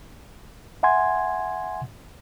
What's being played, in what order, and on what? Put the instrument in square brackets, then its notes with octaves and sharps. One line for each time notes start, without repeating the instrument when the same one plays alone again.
[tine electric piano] E5 F#5 G#5 C6 G#6